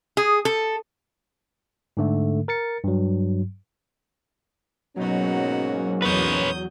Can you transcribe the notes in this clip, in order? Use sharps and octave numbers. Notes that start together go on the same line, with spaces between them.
G#4
A4
G#2 D3 A3
A#4 A6 C#7
G2 F#3
G#2 B2 F#3 A#3 C#4 D#4 F#4
E2 B4 C#5 D#6 G6